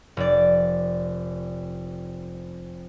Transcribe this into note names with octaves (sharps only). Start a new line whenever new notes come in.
F1 D5